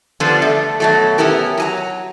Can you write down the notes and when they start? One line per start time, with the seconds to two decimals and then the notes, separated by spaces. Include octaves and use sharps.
0.20 D3 F3 G3 B3 D4 F4
0.42 A3
0.80 B2 F#3 A3
1.18 B3 C#4 E4 G4 A#4
1.58 F#3 G#5 A#5